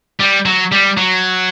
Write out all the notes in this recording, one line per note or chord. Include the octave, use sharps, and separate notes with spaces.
G3
F#3
G3
F#3